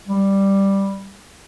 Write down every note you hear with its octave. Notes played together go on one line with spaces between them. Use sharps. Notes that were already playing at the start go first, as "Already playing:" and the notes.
G3